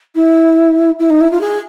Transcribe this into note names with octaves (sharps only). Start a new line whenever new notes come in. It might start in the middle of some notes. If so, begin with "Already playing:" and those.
E4
E4
D#4
E4
F4
G#4